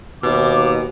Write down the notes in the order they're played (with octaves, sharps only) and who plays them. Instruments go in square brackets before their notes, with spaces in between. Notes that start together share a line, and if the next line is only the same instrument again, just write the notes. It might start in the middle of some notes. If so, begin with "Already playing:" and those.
[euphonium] D#2 [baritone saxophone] B2 [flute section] D6